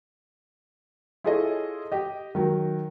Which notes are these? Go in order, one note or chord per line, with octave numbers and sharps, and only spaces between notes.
E4 F4 G#4 A4 C#5 D#5
G4 D#5
D#3 F#3